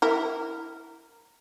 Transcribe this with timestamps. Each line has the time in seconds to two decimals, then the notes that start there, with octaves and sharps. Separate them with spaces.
0.02 E4 A#4